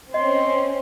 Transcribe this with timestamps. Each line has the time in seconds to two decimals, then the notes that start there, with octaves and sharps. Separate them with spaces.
0.14 C4 C#4 D#5 C6